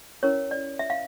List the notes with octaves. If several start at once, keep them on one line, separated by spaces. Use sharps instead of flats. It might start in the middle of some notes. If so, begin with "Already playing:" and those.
C#4 E4 A#4 C#5
D5
E5
F5